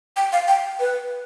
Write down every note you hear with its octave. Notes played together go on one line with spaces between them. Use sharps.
G5
F5
G5
B4